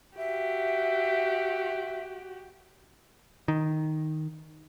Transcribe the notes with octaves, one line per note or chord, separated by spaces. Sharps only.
F#4 G4 E5
D#3